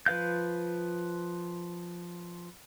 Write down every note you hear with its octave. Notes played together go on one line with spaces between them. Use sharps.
F3 B4 F5 G6